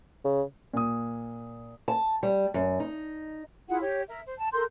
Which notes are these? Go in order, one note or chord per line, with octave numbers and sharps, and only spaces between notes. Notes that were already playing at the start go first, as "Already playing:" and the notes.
C#3
A#2 D#6
A5
G3
F#2
D#4
E4 F4 G#4 F#5
G4 C#5
A#4 E5
C5
A5
A4 A#4 C6 G6